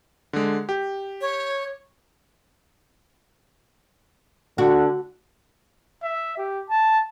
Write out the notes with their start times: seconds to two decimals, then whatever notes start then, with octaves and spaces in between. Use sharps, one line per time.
0.33 D3 G#3
0.69 G4
1.21 C#5
4.58 D3 F#4
6.03 E5
6.38 G4
6.70 A5